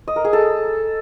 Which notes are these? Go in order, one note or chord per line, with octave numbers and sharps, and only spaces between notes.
D#5
A#4
G#4
A4